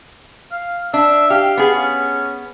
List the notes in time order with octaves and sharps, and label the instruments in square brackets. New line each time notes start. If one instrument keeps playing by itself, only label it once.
[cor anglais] F5
[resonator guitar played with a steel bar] D4 [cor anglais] E5
[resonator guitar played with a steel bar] G4 [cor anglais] F5
[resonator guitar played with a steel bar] B3 G#4
[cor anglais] C#4